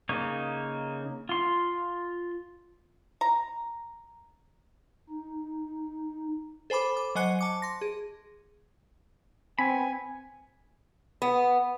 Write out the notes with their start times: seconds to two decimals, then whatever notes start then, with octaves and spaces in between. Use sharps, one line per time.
0.09 C#3 A#3 D#4 C#5
1.29 F4 C6
3.21 A#5
5.10 D#4
6.70 A4 C5 G#5 B5 D6
6.97 D6
7.15 F#3 C5 D#5 G#5 F#6 C#7
7.39 A5 D6 C#7
7.62 C6 A#6
7.81 G#4
9.59 B3 C4 G#5 B5
11.22 B3